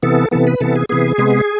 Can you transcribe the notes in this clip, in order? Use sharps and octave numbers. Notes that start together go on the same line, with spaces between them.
C3 E3 B3 A4
C3 E3 B3 A4
B4
C3 E3 B3 A4
G#4
C3 E3 B3 G#4
C3 G#3 B3